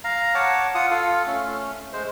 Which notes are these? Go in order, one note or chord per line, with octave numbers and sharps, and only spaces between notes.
F5 A#5
C#5 F#5 A5 D6
F4 F#5 D#6
F4 A4 F5
A3 C#4
G#3 C5